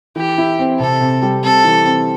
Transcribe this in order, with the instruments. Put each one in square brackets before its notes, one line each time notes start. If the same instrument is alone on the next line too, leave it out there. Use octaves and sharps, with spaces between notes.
[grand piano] E3 [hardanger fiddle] G4
[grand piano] E4
C4
[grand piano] C3 [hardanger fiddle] A4
[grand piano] C3
G3
[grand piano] C4 [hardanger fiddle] A4
[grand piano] E3
C4